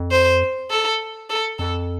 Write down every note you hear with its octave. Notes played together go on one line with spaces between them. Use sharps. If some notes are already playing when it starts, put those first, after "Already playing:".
Already playing: F2
C5
A4
A4
F2 A4